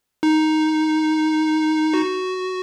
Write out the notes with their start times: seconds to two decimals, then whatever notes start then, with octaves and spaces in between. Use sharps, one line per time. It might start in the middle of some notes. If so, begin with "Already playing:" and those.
0.23 D#4
1.94 F#4